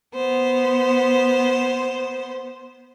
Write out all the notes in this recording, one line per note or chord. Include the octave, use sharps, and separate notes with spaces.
B3 C5